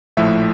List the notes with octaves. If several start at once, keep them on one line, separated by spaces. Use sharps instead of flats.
A#1 A2 F3 A3 E4 E5